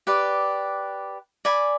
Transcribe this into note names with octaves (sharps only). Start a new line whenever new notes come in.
G4 B4 D5
D5 G#5 B5